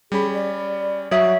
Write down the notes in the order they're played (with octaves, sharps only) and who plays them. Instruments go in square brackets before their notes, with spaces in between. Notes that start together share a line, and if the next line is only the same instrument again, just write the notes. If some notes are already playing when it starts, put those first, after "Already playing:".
[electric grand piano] G3 C#4 B5 [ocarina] G#4
[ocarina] D5
[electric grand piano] F#3 F#4 D#6 [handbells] C#5 E5